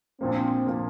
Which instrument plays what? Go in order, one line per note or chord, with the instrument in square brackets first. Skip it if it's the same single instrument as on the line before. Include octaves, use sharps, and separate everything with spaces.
[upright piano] A#1 A#2 F3 A#3 [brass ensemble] C4
[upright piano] A#2 F3 A#3